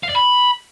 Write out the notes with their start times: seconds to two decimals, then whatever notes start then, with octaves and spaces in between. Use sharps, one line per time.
0.03 F5
0.09 D5
0.15 B5